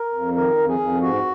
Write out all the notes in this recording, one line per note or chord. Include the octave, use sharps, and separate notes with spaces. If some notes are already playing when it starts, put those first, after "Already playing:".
Already playing: A#4
F2
D#3 A#4
F2
G#4
F2
G#2 F#4